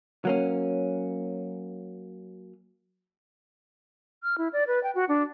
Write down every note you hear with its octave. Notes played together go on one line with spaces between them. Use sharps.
F#3 A#3 C#4
F6
E4
D5
B4
G5
F#4
D4